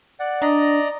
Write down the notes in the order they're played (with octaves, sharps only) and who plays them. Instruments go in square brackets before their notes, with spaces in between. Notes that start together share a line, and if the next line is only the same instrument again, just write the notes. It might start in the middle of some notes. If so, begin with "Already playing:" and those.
[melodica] D5 F#5
[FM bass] D4 [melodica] D5 D#5 A#5